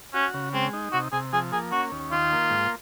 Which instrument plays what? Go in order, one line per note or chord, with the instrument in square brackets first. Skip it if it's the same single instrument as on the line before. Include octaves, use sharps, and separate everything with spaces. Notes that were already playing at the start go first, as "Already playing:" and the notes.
[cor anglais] C#4 [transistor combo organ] F#4
[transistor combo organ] C#3
[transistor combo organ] G#3 [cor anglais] C4
[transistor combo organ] D#4
[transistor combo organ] C3 [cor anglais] F#4
[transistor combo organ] C3 [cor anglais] G#4
[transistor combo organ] F3 [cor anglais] G#4
[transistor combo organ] A#3 [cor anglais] G#4
[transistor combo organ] C#4 [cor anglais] F#4
[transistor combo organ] D#2
[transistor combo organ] D#3 [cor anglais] F4
[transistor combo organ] A#3
G#2